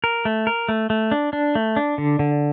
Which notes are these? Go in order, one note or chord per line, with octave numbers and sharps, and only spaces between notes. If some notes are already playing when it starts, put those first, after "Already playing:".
A#4
A3
A#4
A3
A3
D4
D4
A3
D4
D3
D3